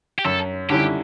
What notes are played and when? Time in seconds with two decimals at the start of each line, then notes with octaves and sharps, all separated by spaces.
0.19 G4
0.24 F#2 A4
0.70 D3 G3 C#4 E4 G4